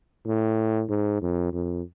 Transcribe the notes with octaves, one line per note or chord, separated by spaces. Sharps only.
A2
G#2
F2
F2